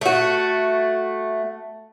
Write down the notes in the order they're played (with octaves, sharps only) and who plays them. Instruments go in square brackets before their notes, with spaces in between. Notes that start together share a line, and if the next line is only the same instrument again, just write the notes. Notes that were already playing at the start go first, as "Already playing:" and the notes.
[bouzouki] A3 F#4